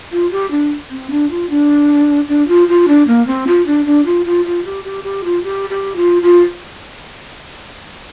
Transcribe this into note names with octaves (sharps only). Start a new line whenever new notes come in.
F4
G4
D4
C4
D4
F4
D4
D4
F4
F4
D4
A#3
C4
F4
D4
D4
F4
F4
F4
G4
G4
G4
F4
G4
G4
F4
F4